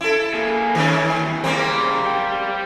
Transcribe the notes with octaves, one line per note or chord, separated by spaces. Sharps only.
E4 A4
A#3 G#4
G2 D#3 E3 C#4
C#3 G3 A#3 C4
G3 G5